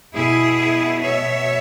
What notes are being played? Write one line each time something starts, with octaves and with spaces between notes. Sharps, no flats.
B2 E4 G#4
C#5 E5